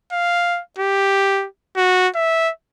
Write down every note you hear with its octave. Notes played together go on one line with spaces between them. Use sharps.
F5
G4
F#4
E5